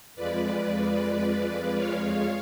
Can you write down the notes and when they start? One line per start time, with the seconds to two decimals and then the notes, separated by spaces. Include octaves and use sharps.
0.15 F2 F3 G#3 B4 D5
1.76 C#5 F5